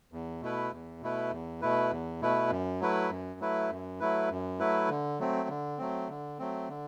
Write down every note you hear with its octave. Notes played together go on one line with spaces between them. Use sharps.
E2
B2 A3 E4 B4
E2
B2 A3 E4 B4
E2
B2 A3 E4 B4
E2
B2 A3 E4 B4
F#2
F#3 A3 E4 B4
F#2
F#3 A3 E4 B4
F#2
F#3 A3 E4 B4
F#2
F#3 A3 E4 B4
D3
F#3 A3 C4
D3
F#3 A3 C4
D3
F#3 A3 C4
D3